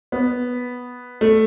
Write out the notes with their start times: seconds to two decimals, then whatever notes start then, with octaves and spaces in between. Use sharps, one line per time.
0.12 B3
1.21 A3